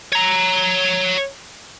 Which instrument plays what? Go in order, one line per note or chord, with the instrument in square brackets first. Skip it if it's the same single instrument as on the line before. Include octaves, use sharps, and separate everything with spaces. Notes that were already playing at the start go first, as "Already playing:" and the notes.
[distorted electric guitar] C#5 A#5